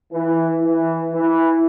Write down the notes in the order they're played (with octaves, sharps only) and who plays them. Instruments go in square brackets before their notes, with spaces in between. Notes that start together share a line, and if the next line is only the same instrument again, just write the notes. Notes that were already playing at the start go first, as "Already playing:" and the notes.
[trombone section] E3
E3
E3